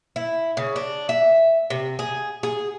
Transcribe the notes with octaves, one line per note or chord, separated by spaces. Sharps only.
E4
C#3
D4
E5
C3
G#4
G#4